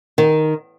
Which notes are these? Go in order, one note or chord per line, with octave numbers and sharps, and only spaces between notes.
D#3